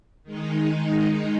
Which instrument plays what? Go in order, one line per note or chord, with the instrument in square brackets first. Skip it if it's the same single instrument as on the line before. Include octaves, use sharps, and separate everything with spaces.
[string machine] D#3 G#3 D#4